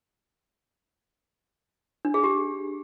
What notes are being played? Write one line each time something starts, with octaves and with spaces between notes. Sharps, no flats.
D4
G#4
G4